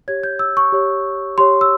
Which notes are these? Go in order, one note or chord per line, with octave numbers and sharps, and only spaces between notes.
G4 C#5 G#6
G6
E6
C#6
G4 C#5
G4 C#5 C6
E6